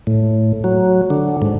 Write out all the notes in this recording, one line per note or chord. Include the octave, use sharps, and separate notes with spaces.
A2
F#3
D3
G#2